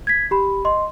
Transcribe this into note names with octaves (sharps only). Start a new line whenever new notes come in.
G#6 B6
G4 B5
D#5 C6